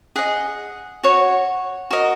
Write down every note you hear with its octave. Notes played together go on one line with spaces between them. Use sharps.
G#4 D#5 F#5
F#4 C#5
F#4 A#4 D#5